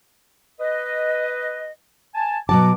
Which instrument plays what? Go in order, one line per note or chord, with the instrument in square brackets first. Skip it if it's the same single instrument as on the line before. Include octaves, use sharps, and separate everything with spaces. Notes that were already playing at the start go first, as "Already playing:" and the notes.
[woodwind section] B4 D#5
G#5 A5
[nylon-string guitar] B2 F#3 A5 [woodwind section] D6